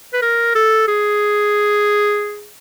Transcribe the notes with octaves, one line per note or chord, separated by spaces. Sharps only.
B4
A#4
A4
G#4